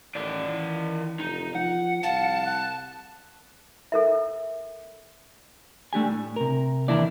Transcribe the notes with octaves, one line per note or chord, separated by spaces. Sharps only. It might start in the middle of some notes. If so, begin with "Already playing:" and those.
A1 D#3 D5
E3
F1 D#4
F3 F#5
C2 F5 A5
F#6
A4 A#4 E5
A3 D4 G4 G#5
A2
C3 A#4
D#2 E3 A#3 D4 E4 D5